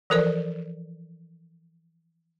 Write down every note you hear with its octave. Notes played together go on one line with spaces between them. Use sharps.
E3 F3 A4 A#4 C5 D5